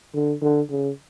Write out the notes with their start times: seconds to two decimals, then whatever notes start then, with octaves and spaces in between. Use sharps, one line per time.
0.14 D3
0.42 D3
0.70 C#3